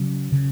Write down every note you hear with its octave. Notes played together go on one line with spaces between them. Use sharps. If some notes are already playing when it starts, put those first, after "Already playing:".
Already playing: C#3 F#3
C#3